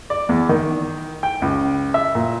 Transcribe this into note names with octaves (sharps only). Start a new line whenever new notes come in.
D5
E2
D#3
G5
C#2
E5
A#2